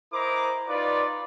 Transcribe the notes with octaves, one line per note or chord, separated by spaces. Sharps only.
E4 A#4 C5 D#5 A#5 D6
D#4 F4 B4 D5